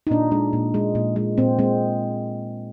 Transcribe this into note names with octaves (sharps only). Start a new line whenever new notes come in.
D#4
A#2 D4
G#3 D4
A#2
G#3
A#2
G#3
A#2 C4
G#3 C4